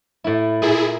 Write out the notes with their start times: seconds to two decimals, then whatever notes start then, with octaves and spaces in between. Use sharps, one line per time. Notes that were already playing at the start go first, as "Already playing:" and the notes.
0.24 A2 E4
0.62 A#2 E4 G#4